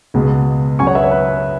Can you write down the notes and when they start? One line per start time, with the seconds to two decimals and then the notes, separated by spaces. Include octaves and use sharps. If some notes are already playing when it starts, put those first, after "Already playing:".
0.14 C#2 B2 G#3 B3
0.79 C#2 C#3 F#3 G#5 C#6
0.87 C#5 F#5
0.95 B4 E5
1.04 C#5
1.11 B4